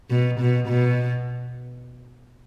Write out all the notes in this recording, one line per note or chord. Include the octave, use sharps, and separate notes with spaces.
B2
B2
B2